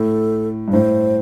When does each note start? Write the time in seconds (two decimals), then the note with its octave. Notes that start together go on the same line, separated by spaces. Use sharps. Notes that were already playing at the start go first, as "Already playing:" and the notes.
Already playing: A2 A4
0.68 G2
0.72 A2 C5